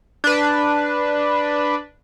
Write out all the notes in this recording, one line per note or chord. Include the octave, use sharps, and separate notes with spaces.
D4 B4